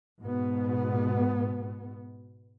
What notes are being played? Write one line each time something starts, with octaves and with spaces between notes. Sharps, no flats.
G#2 B2 B3